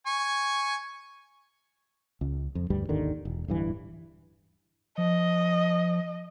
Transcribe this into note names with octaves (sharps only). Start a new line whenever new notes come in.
G#5 C#6
C#2
F2
D2 G2 G3
G#1 D#2 D3 D#3
E1
D1 G2 E3
F3 D#5